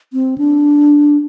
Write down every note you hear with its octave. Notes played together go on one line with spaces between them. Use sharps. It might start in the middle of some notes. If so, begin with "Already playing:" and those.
C4
D4